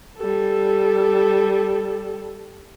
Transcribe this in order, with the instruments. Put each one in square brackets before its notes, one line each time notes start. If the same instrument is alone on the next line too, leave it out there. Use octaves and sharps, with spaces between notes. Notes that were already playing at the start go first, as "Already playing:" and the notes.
[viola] G3 A4